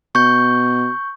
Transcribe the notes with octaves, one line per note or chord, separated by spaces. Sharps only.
B2 C#6 G6